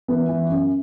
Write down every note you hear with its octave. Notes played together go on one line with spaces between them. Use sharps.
E3 B3
E3
F#2